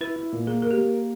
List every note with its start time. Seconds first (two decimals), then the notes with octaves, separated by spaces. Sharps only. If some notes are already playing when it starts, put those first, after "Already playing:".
0.01 E4 B4
0.16 E4
0.33 A#2
0.47 A#3 G#4
0.62 G#4 A#4
0.71 G4
0.78 A#3